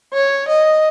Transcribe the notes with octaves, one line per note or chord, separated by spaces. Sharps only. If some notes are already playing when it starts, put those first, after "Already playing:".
C#5
D#5